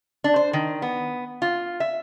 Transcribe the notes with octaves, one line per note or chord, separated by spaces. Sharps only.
D4
C5
D#3
B3
F4
E5